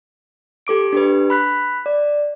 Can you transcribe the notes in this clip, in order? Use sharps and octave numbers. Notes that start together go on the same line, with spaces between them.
G4 A4 D6 D7
D4 G4 B4
B5 F#6 B6
D5